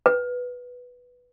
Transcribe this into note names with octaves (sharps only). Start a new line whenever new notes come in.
B4